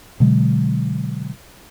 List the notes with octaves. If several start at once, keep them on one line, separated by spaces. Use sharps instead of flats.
B2 D3 F#3 G#3